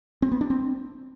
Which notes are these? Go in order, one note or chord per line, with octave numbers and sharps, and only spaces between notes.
C4
B3
D4
C4